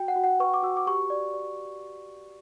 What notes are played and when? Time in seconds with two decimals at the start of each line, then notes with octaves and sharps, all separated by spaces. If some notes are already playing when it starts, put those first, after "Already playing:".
Already playing: F#4 G5
0.08 F#5
0.16 F#4
0.24 F#5
0.40 B4 C#6
0.54 D6
0.63 F#4 E6
0.77 D6
0.87 G4 C#6
1.10 D5
1.34 D5